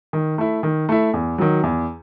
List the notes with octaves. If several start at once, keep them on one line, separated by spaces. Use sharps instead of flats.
D#3
A3 E4
D#3
A3 E4
E2
D#3 F#3
E2